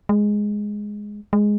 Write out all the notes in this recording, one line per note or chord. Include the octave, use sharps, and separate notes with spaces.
G#3
G#3